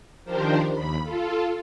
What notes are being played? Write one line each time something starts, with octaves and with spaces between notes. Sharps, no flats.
D#3 F3 D4 G4 A#4 C5
D#2 B5
F4 A4